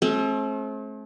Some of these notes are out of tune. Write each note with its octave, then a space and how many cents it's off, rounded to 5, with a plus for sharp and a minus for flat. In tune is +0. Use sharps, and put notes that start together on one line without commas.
A3 -40 C4 +40